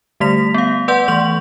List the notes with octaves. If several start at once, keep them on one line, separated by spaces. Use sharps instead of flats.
D3 G3 A3 B6 F7
B3 F5
B4 D5 F#5 C6 G6
E3 A3 C#6 F7 F#7